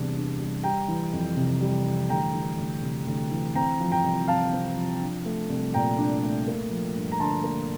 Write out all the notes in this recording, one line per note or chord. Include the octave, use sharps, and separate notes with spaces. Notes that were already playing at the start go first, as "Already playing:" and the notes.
Already playing: E2 C3 G3 D4
D4
G3
G3 G5 A#5
E3
F2
C3
G3
E3
D2 G5 A#5
E3
D2
C3
D2
E3
C4 G5 A#5
F3
G5 A#5
C2
C3 F5 A5
C4
F3
D4
A3
C2
A#2 G5 A#5
D4
A3
A#3
F3
G2
A#5
D3 A5 C6
A#3